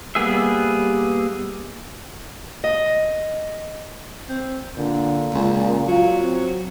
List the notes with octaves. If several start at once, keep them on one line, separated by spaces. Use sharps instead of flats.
G3 A#3 B3 G#4 E5
D#5
C4
A#2 D3
C#2
F#3 F4
C4